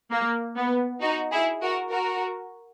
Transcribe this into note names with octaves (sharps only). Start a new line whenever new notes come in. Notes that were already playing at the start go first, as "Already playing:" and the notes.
A#3
B3
D#4 F#4
E4 G#4
F#4 A#4
F#4 A#4